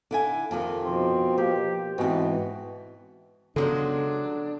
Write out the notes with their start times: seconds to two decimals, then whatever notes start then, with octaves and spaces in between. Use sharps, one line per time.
0.11 D3 E4 G#5
0.51 F2 C3 D#3
0.85 B2 F3 C4
1.38 A#3 G4
1.98 G#2 B2 E3 C4
3.56 C#3 F3 F#3 G#3 B3 D4 A4